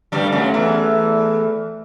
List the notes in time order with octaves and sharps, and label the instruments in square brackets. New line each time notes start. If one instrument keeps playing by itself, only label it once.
[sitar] G2 G3
[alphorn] A3
[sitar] F#2 F#3
E2 E3